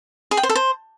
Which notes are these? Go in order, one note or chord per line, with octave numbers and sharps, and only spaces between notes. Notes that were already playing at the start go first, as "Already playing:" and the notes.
G#4
G5
C5
A4
C5